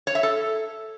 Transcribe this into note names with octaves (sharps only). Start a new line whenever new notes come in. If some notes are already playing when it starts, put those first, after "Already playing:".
C#5
E5
A4